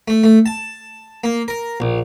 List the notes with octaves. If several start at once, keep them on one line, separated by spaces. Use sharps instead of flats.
A3
A3
A5
A#3
A#4
A#1